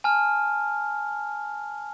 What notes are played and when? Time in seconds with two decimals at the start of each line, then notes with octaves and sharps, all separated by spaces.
0.04 G#5 A5 F6